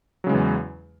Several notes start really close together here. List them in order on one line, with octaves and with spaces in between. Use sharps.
F#3 C#3 G#3 E3 E2